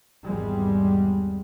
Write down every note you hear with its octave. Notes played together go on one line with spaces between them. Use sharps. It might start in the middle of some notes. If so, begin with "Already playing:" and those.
G#1 E2 G3 G#3